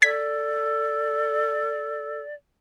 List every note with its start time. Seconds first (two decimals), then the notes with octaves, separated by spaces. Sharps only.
0.02 A4 D5 G#6 B6